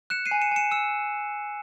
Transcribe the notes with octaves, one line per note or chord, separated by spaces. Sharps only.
F#6 C#7 E7
C7 D#7
G#5
C#7 E7
G#5 C#7 E7
E6 C#7 E7